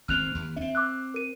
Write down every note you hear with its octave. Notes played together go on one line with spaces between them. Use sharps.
G#1 G#2 C4 F6 F#6 F7
D#2
C4 C#4 E5
D6 E6 F#6
A#4 D#7